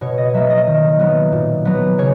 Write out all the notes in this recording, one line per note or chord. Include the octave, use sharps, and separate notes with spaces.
B2 C#5
D#5
F#3 A#3 E5
D#5
D#3
F#3 B3
A#2
F#3 B3
C#3 C#5